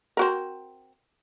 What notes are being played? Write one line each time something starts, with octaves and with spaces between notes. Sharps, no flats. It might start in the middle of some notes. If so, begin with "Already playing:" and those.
C4 F#4 A#4